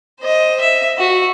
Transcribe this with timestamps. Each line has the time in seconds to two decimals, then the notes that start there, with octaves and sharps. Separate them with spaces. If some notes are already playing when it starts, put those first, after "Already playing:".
0.20 C5 D#5
0.61 E5
0.99 F#4